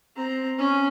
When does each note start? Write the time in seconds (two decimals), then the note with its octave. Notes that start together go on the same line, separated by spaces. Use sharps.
0.16 C4 A#5
0.58 C#4